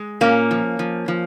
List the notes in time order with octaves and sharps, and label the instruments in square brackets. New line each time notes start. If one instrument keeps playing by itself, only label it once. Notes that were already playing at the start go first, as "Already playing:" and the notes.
Already playing: [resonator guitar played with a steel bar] G#3
A#2 A#3 C#4
F3
F3
F3